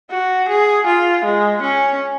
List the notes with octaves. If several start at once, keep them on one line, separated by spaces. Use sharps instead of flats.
F#4
G#4
F4
G#3
C#4